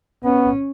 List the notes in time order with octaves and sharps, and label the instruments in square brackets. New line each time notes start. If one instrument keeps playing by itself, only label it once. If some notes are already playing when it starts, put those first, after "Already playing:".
[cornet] B3 [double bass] C#4